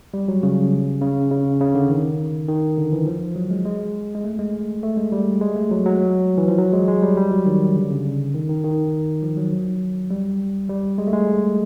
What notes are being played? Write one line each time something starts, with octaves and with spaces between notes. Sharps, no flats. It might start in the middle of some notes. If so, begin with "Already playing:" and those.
G3
F#3
C#3
C#3
C#3
C#3
D3
D#3
D#3
D3
E3
F3
F#3
G#3
G#3
G#3
A3
G#3
A3
G#3
G3
G#3
A3
F#3
F#3
E3
F3
F#3
G#3
G#3
G3
G3
F#3
D#3
D3
C#3
D#3
D#3
D#3
F3
F#3
G3
G3
G#3
A3
G#3